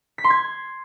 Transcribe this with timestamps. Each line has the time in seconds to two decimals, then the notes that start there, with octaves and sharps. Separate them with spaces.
0.18 B6
0.24 C6
0.30 G#6